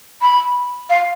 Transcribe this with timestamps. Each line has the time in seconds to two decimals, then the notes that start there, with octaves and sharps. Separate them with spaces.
0.22 B5
0.90 F5